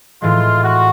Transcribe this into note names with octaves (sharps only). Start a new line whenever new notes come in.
A2 E3 G#3 F4
F#4